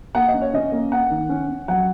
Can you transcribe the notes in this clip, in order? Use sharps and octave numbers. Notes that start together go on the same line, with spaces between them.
A#3 F#5
D#5
C#4
C#5
C#4 D#5
A#3
A#3 F#5
D#3
C#4
C#4
F#3 F#5